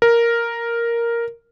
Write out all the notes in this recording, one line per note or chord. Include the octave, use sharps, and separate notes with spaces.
A#4